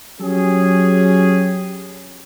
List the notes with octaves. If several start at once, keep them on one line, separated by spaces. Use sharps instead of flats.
F#3 C#4 G4 G#4